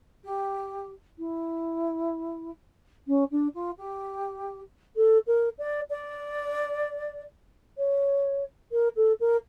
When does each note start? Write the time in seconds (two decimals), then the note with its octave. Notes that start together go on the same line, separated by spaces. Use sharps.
0.24 G4
1.18 E4
3.07 C#4
3.31 D4
3.54 F4
3.77 G4
4.96 A4
5.27 A#4
5.58 D5
5.90 D5
7.77 C#5
8.72 A#4
8.96 A4
9.20 A#4